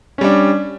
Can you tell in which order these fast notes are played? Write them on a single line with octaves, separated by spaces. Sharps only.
C#4 G3 D4